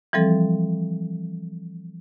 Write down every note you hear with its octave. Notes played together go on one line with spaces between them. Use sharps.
E3 F3 G3 C4 A4